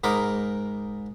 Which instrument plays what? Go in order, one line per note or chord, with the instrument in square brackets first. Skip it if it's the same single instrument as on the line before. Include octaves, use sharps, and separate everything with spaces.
[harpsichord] G#2 D#4 A#4 B5 C6 D6